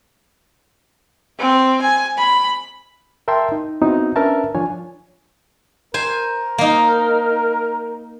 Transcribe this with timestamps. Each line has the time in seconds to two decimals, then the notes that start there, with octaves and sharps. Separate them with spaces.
1.39 C4
1.82 G#5
2.18 B5
3.28 A#4 E5 G5 A5 C6
3.52 D#4
3.81 B3 C4 D#4 E4 F#4
4.16 C#4 D4 A#4 B4 E5 A5
4.55 F3 D4 F4 C#5 G#5
5.94 A#4 C5 G#5
6.58 A#3 D#4